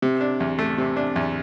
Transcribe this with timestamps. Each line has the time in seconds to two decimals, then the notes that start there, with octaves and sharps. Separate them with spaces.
0.02 C3
0.21 D4
0.40 E2
0.59 A3
0.78 C3
0.96 D4
1.16 E2